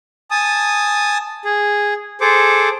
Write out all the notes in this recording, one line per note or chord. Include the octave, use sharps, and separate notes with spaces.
G#5 A5 D#6
G#4
G#4 A4 C5 D6